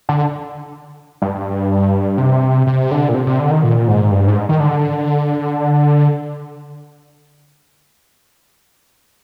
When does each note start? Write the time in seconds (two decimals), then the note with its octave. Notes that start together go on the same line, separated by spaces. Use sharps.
0.09 D3
1.22 G2
2.18 C3
2.66 C3
2.91 D3
3.09 A#2
3.15 C3
3.27 C3
3.39 D3
3.51 D#3
3.64 A#2
3.88 G#2
4.11 G2
4.28 G#2
4.49 D#3
4.60 D3